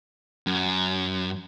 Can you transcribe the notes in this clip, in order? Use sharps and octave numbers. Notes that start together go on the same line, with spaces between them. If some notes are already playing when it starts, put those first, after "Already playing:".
F#2